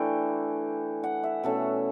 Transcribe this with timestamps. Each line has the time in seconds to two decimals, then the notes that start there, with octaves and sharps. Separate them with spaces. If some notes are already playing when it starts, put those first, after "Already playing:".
Already playing: E3 A3 D4 G5
1.04 F#5
1.23 E5
1.43 B2 A3 C#4 A4